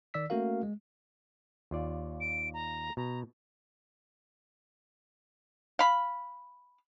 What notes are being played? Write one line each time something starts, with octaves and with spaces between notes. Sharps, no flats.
D#3 D5 E6 B6
A3 A#3 C#4 F#4 A#4 F5
G#3
D#2 F4 D5
D7
A#5
B2 A#5
F5 B5